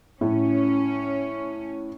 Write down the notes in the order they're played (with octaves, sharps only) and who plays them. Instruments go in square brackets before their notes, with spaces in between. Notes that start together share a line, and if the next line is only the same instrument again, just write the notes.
[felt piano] A2 [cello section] C#4